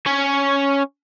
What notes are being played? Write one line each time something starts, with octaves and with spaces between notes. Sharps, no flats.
C#4 C#5